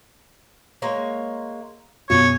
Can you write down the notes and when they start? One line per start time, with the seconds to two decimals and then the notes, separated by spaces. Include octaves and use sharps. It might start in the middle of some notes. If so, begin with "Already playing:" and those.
0.82 G#3 A#3 C#5
2.10 F#2 B2 F4 G#4 C#5